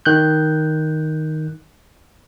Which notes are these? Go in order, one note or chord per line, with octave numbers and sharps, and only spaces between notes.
D#3 F#6 G6